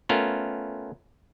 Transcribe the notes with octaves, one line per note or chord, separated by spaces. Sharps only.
A3 B3 C#4 F4 A#4